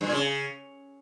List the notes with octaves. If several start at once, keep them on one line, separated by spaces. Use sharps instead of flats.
G2
A#2
C#3